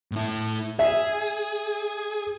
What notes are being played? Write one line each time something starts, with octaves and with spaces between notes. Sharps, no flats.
A2 E4
G#4 E5